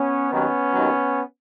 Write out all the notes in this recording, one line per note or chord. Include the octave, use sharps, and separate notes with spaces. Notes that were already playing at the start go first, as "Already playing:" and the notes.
Already playing: B3 C#4
D#2 D#3 F#3 B3 C#4
D#2 D#3 F#3